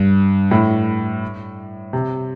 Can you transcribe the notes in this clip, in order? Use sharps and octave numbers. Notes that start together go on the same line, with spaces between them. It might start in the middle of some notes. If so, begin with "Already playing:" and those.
Already playing: G2
A2
C3